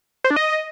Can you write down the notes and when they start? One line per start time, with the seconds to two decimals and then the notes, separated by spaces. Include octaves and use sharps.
0.24 C5
0.30 D4
0.36 D#5